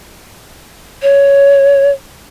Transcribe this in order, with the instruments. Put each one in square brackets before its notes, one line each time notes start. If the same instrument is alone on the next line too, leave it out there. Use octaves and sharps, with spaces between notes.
[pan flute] C#5